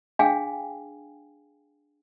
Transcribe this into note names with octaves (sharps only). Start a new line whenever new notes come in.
D4 G#4 F5 G5 G#5